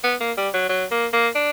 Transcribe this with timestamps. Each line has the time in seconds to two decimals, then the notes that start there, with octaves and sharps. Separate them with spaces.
0.04 B3
0.21 A#3
0.37 G3
0.54 F#3
0.69 F#3
0.91 A#3
1.13 A#3
1.35 D4